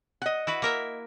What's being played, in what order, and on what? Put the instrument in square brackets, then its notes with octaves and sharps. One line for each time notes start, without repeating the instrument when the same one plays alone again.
[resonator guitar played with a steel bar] D#5 F#5
[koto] E4 F#4 B4
A#3 A#4 E5